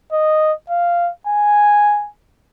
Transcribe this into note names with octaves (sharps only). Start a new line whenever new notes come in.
D#5
F5
G#5